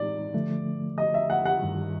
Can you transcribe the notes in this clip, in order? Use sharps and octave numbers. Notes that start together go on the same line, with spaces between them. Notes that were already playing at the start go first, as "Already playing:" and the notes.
Already playing: A2 E3 G#3 C4 D#4 D5
D3 F3 A3
D#5
E5
F#5
F#5
G2 D#3 G3